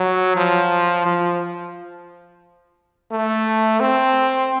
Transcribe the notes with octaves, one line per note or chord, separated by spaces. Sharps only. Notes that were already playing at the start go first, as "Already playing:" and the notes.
Already playing: F#3
F3
F3
A3
C4